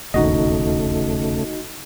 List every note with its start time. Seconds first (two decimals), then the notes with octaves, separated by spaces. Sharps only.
0.14 E1 A#1 D#2 C#3 A3 D#4 F#4 D#5